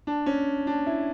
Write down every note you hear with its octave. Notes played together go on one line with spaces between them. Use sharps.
D4
C#4
D4
E4